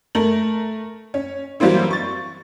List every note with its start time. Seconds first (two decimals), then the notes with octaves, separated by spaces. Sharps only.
0.15 A3 A#4 F#7
1.14 C#4
1.60 E3 F#3 G3 A#3 C4 E4
1.91 C#6 A6